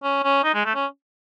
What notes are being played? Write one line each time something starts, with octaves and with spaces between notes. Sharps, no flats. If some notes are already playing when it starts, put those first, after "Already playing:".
C#4
C#4
D#4
G#3
A3
C#4